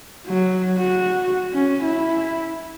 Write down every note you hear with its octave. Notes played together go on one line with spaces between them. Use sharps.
F#3
F#4
C#4
E4